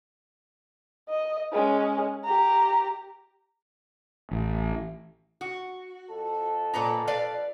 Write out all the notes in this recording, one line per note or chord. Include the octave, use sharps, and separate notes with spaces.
D#5
G#3 C#4
G4 A#5
A1
F#4
F2 A4
A#2 B4 A#5
B4 D5 F5